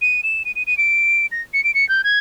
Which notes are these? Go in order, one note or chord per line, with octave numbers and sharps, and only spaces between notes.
D#7
E7
D#7
D#7
D#7
D7
A#6
C#7
D7
C#7
G6
G#6